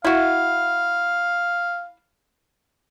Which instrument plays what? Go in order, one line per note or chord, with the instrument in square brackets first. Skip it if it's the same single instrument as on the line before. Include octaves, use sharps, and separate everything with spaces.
[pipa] E4 F#4 [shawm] F5